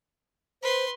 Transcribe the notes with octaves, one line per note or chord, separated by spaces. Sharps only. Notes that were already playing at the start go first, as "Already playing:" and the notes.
B4 C5 C6